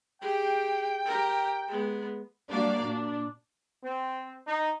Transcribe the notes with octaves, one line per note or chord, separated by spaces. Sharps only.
G4 G#4 G5
G4 A#4
G#3 B3
G3 A#3 D4 F#4 D5 F5
A#2 D4
C4
D#4